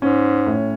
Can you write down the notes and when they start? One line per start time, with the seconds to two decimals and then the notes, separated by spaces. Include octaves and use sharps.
0.02 G#2 C#4
0.46 A2